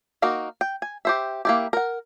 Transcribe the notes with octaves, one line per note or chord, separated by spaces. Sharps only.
A#3 D#4 F#4 A#4
G5
G#5
G4 C5 E5
A#3 E4 G4
A#4 F#5